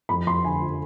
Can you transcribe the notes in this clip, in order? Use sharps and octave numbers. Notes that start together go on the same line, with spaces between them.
F2 B5
F2 C6
D3 G#5
F3